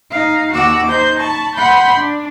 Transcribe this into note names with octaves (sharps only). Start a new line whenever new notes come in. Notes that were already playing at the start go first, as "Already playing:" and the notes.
D#4 F5
D#2 F#4 F#5 D6 E6
D#4 C5 G6
A5 B5 C#6
F#5 B5 C6 G6
D4